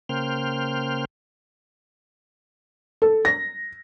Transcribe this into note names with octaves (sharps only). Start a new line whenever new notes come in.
C#3 A#3 C5 G5 F6
A4
A#6